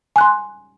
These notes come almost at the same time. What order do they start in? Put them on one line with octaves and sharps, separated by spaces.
G#5 F#6 C6